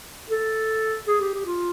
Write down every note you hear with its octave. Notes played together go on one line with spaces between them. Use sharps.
A4
G#4
G4
G4
F4